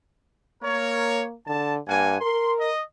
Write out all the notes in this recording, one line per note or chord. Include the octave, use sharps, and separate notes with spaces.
A#3 A#4 C#5
D3 A5
G2 A#3 F#5 G#5
A#4 C6
D#5